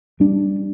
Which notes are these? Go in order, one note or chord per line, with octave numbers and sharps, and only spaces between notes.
G3 D4